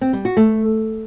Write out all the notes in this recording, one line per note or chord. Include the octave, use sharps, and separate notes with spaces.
C4
G3
F#4
A3